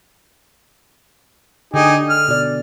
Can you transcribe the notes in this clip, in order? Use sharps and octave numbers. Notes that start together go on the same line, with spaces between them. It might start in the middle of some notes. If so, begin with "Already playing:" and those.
D3 D#4 G4 G#4
F6
B2 D5